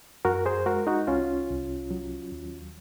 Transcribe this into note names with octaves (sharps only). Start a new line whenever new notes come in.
F#2 F#4 A#4
G#4 C5
G#3 F#4 A#4
D#4 F#4
C2 C#4 F4
C2
F#3
D#2